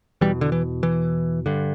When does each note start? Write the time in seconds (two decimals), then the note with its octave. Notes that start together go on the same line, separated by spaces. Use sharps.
0.21 E2 B2 E3 G3
0.41 D3
0.52 E3
0.83 E3
1.46 G2 D3